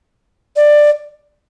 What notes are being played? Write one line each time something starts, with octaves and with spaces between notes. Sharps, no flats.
D5